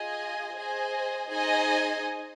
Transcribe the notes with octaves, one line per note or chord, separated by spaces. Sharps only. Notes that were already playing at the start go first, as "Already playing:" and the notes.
Already playing: F4 G#4 D#5 G#5
G#4 C5 D#5 G#5
D#4 G#4 C5 D#5 G#5